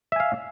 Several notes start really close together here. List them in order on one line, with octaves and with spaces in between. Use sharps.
E5 G#5 F5